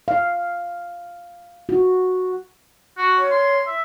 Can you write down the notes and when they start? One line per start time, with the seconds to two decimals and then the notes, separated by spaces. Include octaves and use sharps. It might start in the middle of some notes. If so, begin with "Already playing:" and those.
0.08 F5
1.69 F#4
2.98 F#4
3.17 C#5
3.31 C6
3.67 E5